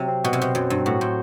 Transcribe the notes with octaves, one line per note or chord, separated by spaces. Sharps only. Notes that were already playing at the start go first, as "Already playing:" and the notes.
Already playing: C3 F#3
C4
B2 F#4
C3
B2 C5
F#2 F#3
G2 C4
A2 F#4
A2 C5